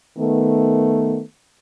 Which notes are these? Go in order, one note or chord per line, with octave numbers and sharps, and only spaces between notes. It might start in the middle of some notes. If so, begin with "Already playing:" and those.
D#3 A3 B3